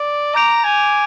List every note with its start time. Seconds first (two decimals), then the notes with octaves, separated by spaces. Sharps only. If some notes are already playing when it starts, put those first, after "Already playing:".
Already playing: D5
0.35 A#5 D6 G6 D7 F7
0.64 G#5